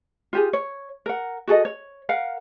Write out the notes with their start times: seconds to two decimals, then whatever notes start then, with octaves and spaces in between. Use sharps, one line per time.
0.33 F4 G4 G#4
0.53 C#5
1.06 A#4 F#5
1.47 F#4 G#4 A4 D#5
1.65 C#5
2.09 A#4 F5 F#5